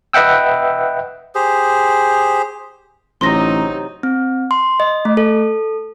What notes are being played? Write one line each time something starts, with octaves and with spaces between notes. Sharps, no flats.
B4 D#5 E5 F#5 G5 E6
G4 G#4 C5
A1 C3 F#3 D#4 C6 A#6
C4
C6
D#5
A3
A4